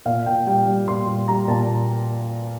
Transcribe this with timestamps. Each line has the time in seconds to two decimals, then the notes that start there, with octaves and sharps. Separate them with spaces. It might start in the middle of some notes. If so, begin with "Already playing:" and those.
0.05 A#2 F5
0.26 A#2 G5
0.46 G3 G5
0.67 G3
0.87 A#2 C6
1.07 G3
1.28 G3 A#5
1.48 A#2 A5